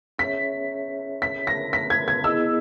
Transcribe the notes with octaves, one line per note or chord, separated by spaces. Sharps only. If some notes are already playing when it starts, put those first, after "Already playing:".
C#4 G#4 C#5 E5 B6
B6
A#6
B6
G#6
G#6
B3 E4 G#4 D#5 E6